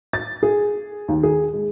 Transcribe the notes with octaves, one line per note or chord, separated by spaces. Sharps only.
A6
G#4
D#2
G#4
G#3